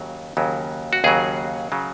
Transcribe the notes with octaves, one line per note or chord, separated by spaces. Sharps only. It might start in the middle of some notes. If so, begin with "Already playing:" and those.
Already playing: D#2 C#3 F#3
D#2 C#3 F#3
F#4
D#2 C#3 F#3 G#4
C#3 F#3